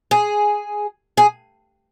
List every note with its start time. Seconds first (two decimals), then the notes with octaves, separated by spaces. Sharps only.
0.11 G#4
1.17 G#4